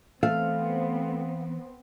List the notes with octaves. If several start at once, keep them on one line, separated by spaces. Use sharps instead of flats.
E3 A3 B3 C4 F5